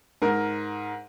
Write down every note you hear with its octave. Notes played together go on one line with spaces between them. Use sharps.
G#2 A#4